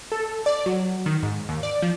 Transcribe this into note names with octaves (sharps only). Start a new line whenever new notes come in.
A4
D5
F#3
D#3
G#2
D#2
D5
F3